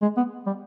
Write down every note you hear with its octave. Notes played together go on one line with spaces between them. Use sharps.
G#3
B3
G3